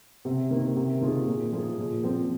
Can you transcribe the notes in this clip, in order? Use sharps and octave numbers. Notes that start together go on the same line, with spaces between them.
C3
D#3 A#3
C3
D#3 A#3 F4 G#4
A#2
F3 A#3 F4 G#4
A#2
F3 C4